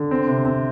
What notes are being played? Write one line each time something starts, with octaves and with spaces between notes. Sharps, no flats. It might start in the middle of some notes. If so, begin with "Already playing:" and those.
Already playing: D3
C4
C3
C4